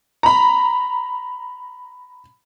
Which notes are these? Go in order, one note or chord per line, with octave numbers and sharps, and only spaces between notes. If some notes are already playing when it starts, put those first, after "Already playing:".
A#5 B5